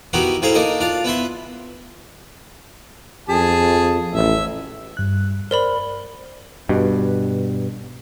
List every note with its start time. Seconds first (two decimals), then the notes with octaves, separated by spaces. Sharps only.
0.13 B3 D#4 E4 F#4 G4 A#4
0.42 A2 E4 G#4 C5 F5 A#5
0.54 A#3 D4 D#4 A#4 D#5
0.81 D4 F4 F5
1.04 B3 E4 E5 C6
3.29 F2 G#4 A5
4.13 A1 E5
4.97 G2 F#6
5.51 A#4 C5 D5 B5
6.69 G2 B2